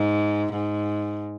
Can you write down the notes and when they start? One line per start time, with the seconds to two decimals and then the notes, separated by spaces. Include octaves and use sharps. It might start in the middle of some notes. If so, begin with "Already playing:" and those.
Already playing: G#2
0.53 G#2